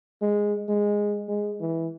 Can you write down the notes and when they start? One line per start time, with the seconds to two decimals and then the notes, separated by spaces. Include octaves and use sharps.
0.22 G#3
0.69 G#3
1.29 G#3
1.60 E3